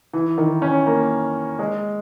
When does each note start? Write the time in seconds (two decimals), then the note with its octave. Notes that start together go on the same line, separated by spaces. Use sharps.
0.13 E3
0.38 D#3
0.62 C#4
0.86 A#3
1.59 G#3